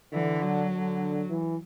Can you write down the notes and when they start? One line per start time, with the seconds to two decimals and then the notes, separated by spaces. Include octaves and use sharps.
0.13 D3 E3
0.42 F#3
0.72 D3
1.30 E3